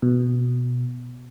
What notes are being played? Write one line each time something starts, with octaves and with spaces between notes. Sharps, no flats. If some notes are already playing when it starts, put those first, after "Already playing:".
B2